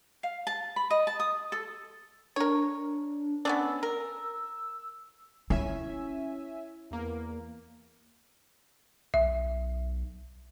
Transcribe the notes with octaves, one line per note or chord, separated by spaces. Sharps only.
F5
A5
B5
D#5
A5
D#6
A4
D4 A#4 C#5
B3 C#4 D4 E6
A#4
C#4 E4 E5 G#5
E2 A#3
B1 E5